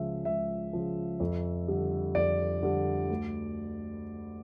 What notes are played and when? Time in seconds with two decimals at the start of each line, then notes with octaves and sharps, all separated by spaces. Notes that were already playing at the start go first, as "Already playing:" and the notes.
Already playing: C#2 C#3 F3 E5
0.25 C#2 E5
0.73 C#3 F3
1.20 F2
1.68 D3 G3
2.15 F2 D5
2.62 D3 G3
3.09 D2